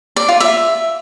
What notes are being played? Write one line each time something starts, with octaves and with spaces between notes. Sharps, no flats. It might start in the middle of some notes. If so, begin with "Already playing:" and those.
D5
F4
E5